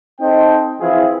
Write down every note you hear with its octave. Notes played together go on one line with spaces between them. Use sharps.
C4 D#4 A4 C5 D#5 G5
E3 F3 C4 E4 F4 G#4